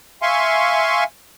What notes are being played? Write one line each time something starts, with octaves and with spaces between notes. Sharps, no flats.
E5 F5 G#5 C6 C#6